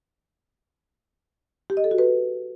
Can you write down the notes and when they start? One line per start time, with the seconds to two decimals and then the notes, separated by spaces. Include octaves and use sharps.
1.70 G4
1.77 D#5
1.84 A4
1.91 F#4
1.98 B4